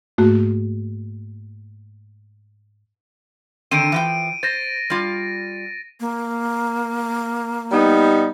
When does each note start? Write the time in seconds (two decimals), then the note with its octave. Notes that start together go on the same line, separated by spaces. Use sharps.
0.18 G#2 A3 A#3 F#4
3.71 D3 D#3 C4 D7 D#7
3.92 E3 F3 G5
4.43 C5 A6 A#6
4.90 G3 F4
6.00 A#3
7.71 G3 B3 D#4